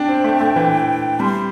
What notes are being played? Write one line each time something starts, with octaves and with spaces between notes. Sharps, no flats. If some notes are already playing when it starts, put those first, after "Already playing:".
Already playing: D4 G5
C4
A3
A3
E3
G3 C6